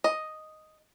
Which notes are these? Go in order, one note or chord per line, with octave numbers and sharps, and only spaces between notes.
D#5